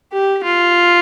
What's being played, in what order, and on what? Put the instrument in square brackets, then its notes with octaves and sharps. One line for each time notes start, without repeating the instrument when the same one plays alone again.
[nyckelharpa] G4
F4